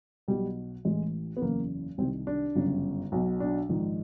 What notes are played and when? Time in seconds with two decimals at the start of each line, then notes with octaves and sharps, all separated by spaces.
0.28 B1 B2 G3
0.85 A1 A2 E3 G#3
1.37 B3
1.42 F#1 E2 C#3 A#3
1.98 C2 C3 D#3 C4
2.27 D4
2.55 G1 F#2 C#3
3.12 B1 B2
3.40 D4
3.69 A#1 G#2 D#3